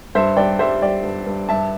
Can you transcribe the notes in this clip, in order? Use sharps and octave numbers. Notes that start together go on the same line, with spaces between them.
G2 C5 E5
G2 D5 G5
G3 C5 E5
G3 D5 G5
G2
G2
G2 E5 A5